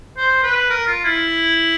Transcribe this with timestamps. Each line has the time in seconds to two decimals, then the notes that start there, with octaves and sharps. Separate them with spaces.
0.17 C5
0.43 B4
0.70 A#4
0.87 F4
1.05 E4